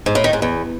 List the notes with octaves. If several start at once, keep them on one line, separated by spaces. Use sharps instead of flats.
G#2
A2
D#3
G#2
E2